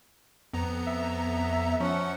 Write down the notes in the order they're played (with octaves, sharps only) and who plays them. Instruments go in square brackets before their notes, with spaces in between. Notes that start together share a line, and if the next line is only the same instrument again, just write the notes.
[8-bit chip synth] F2 B3 A#5
[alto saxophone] E5
[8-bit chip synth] F3 F#5 [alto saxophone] C#4